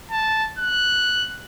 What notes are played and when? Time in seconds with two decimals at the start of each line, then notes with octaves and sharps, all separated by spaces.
0.11 A5
0.58 F#6